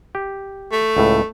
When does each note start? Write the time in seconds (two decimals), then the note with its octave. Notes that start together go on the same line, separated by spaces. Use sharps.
0.15 G4
0.72 A3
0.97 C#2 A2